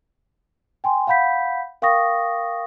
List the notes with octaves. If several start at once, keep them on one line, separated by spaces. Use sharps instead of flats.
G5 G#5 C6
F5 F#5 B5 G6 B6
A#4 F5 G5 C#6 D#6 A#6